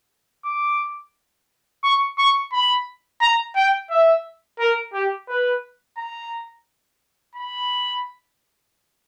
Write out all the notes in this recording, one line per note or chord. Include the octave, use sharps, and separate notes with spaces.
D6
C#6
C#6
B5
A#5
G5
E5
A#4
G4
B4
A#5
B5